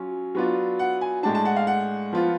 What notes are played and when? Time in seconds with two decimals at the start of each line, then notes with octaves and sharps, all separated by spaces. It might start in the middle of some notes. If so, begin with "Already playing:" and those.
Already playing: F#3 C#4 F4
0.35 F#3 B3 D4 F4
0.79 F#5
1.01 G#5
1.23 A2 G#3 D4 A5
1.35 A5
1.45 F#5
1.56 F5
1.67 F#5
2.12 F3 B3 F4